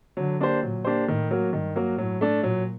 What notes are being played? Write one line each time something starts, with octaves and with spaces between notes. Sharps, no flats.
D3 F#3
A#3 D4 G4 C5
A#2 F#3
A#3 D4 G4 C5
A2 D#3
F#3 A#3 F#4 A#4
G2 D#3
F#3 A#3 F#4 A#4
A2 F#3
A3 D4
A#2 F#3